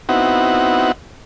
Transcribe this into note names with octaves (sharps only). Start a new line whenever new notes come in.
B3 C4 D#4 E4 F#4 F#5